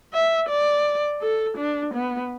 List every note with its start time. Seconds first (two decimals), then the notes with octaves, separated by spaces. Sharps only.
0.14 E5
0.49 D5
1.22 A4
1.58 D4
1.94 B3